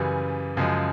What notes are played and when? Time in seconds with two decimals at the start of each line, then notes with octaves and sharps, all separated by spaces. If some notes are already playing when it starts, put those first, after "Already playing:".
Already playing: F#2 C#3 E3 G3
0.57 F#2 C#3 F3 G#3